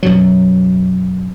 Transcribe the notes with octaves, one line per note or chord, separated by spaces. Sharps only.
F#2 B2 F#3